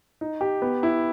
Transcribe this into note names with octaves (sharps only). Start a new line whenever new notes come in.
D#4
G4
B3
E4